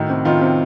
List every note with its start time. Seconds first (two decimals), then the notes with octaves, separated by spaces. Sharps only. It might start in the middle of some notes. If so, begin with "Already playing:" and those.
Already playing: A2 D#3 F#4
0.09 C3
0.25 D#3 F4
0.41 C3